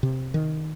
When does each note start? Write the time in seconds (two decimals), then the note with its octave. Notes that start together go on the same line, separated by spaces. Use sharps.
0.03 C3
0.34 D#3